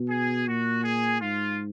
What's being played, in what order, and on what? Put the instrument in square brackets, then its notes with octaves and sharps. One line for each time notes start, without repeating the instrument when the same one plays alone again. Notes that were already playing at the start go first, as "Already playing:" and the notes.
Already playing: [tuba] B2
[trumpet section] G#4
[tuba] A#2 [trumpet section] F#4
[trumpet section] G#4
[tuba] G#2 [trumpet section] F4